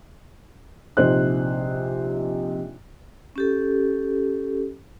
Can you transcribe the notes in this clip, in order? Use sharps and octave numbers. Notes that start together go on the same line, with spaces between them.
A#1 C3 D#4 C5 F#6
C#4 G4 A4